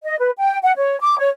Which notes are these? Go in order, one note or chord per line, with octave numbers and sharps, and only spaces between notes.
D#5
B4
G5
F#5
C#5
D6
C#5